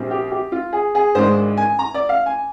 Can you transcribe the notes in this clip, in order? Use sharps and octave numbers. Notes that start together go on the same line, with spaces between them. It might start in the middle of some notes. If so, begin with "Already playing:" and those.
Already playing: A#1 A#2 G3 C4
G4
G4
F4
G#4
G#4
G#1 G#2 D#3 G#3 D4 C5
G#5
A#5
D5
F5
G#5